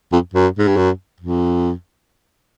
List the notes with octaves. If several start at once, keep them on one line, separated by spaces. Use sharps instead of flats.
F2
F#2
G#2
G2
F#2
F2